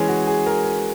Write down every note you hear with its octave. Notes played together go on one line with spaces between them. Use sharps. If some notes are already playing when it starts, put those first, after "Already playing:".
Already playing: E3 G#3 C#4 G#4
F#4
G#4
A#4